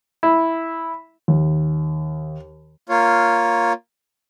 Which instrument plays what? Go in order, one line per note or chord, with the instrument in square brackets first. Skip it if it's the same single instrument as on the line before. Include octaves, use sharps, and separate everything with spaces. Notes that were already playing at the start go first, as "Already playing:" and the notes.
[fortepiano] E4
[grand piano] D#2
[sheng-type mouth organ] A#3 F4 C#5